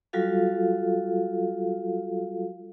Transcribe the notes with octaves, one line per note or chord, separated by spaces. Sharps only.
F#3 G3 F4 F#4 A4 F5